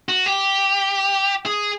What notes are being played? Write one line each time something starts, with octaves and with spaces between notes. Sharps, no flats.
F#4
G4
G#4